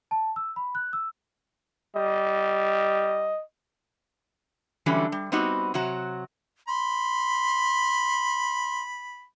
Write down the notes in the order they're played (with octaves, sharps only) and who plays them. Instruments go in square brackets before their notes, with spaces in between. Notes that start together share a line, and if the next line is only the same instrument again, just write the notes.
[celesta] A5
E6
B5
F#6
E6
[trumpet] G3 [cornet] D#5
[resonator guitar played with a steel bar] D3 E3 F#3 G3 A3 C#4
G3
G3 B3 C4 D#4 F#4 G4
C3 F#3 F#4 A#5
[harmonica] B5 [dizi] C6